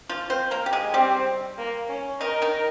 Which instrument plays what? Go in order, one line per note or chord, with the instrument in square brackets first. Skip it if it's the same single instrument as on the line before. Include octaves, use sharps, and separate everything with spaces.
[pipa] F3 F4
C4 C5
A#3 A#4
G4
G#3 G#4
[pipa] G3 G4 [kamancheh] C4
[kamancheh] A#3
C#4
[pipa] D#3 D#4 [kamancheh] A#4
[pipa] D#3 D#4